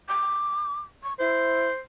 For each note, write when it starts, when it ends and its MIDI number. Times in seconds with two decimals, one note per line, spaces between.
0.09 0.80 86
1.03 1.13 85
1.19 1.67 64
1.19 1.80 72